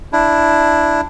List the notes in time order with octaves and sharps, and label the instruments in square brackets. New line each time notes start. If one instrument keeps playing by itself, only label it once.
[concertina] D4 E4